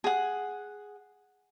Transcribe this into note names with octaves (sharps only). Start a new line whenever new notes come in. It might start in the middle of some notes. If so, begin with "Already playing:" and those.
G#4 F#5